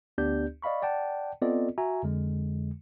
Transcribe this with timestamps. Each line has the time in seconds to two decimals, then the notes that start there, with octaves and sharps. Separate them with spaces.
0.18 D2 B3 D4 G4 D5 G6
0.62 D5 D#5 F5 B5 C#6
0.82 D5 F#5 G5 A5
1.42 B3 C4 F4 A4 D5 D#5
1.78 F#4 E5 G#5 A#5
2.03 F2 D3 G#3